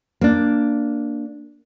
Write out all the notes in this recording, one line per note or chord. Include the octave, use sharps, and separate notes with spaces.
A#3 D4